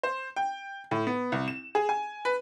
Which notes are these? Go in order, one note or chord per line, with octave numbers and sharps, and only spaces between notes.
C5
G5
A2
B3
C2
E7
G#4
G#5
B4